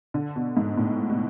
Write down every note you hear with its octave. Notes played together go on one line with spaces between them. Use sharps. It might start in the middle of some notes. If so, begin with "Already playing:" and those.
D3
B2
G#2
A2
B2